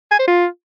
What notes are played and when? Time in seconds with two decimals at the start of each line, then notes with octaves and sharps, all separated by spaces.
0.11 G#5
0.19 C5
0.27 F4